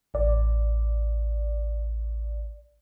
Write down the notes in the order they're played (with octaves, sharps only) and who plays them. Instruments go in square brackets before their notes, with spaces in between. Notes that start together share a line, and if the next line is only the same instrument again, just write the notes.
[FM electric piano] A1 D5